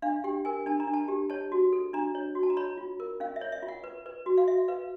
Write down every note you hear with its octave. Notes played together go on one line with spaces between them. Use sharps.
D4 F5
G4 G5
A#4 G#5
D4 A5
A#5
D4
A5
G4
C#5 A5
F#4
A4
D4 A#5
C#5
F#4
A5
A#5
C#5 B5
F4
A#4
C#4 F5
E5
C#5
E5
F4
F#5
B4
B4
F#4
F5
F#4 E5
B4 F5